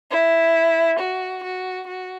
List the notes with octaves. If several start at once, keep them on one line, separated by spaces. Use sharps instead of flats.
E4
F#4
F#4
F#4